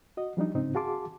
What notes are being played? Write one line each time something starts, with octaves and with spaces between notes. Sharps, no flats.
F#4 D#5
F3 G3 D4 D#4
G#2 C#3 C4 D#4
F#4 G#4 F5 A5 C6 D6